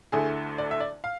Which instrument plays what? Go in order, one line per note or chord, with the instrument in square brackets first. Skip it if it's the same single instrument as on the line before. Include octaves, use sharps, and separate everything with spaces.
[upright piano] D2 D3 A3 E4 G#4
D5
E5
D5
F5